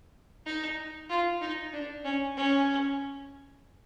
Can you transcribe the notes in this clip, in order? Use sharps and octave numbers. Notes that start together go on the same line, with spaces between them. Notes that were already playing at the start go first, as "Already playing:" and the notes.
D#4
F4
D#4
D4
C#4
C#4